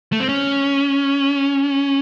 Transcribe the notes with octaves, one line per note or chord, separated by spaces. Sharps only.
A3
C4
C#4